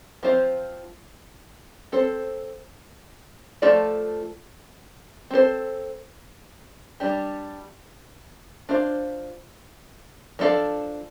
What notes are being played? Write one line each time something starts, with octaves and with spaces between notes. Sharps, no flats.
F3 C4 F4 C5 F5
C4 A4 C5
F3 A3 F4 A4 D5
C4 A4 C5
G3 D4 G4
D4 F4 C5 F5
F3 D4 A4 D5 F5